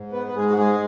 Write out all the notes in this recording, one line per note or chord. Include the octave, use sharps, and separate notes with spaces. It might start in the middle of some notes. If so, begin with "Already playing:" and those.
Already playing: G#2
B3 B4
B4
G#2 G#3 G#4
F#4
G#3 G#4